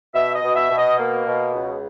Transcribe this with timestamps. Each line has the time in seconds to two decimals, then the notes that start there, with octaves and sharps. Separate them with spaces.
0.14 B2 E5
0.34 D#5
0.42 B2
0.55 E5
0.69 B2
0.77 D#5
0.98 A#3
1.25 B2
1.53 C#2